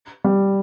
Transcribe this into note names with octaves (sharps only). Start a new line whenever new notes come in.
G3